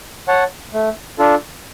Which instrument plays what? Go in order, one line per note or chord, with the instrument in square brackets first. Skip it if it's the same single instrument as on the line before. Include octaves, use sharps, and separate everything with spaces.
[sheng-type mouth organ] C#5 F#5 A5
A3
D4 F4 A4